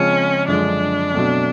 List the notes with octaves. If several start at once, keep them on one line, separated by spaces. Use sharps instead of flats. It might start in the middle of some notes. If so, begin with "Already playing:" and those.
Already playing: C#3 F3 G#3 C4 C#4 F4
F#2 D3 F3 G#3 D4
B2 F#3 A3 C4